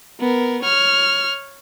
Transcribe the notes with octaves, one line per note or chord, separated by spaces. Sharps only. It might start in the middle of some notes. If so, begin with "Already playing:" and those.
B3 A#4
C#5 F6